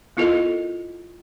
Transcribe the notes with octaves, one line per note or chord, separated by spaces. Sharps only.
B3 E4 F4 A4 A#4 D#5